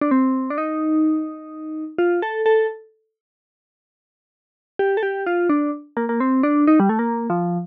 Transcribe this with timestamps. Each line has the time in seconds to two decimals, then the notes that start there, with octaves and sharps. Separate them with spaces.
0.01 D4
0.11 C4
0.50 D4
0.58 D#4
1.98 F4
2.22 A4
2.46 A4
4.79 G4
4.97 A4
5.03 G4
5.26 F4
5.49 D4
5.97 A#3
6.09 A#3
6.20 C4
6.43 D4
6.67 D#4
6.80 G3
6.89 A3
6.99 A#3
7.30 F3